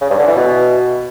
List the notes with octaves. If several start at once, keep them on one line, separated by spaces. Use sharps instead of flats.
C#3
G2
D3
E3
B2